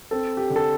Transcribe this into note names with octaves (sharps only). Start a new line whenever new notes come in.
C4 A4
G4
D3
A4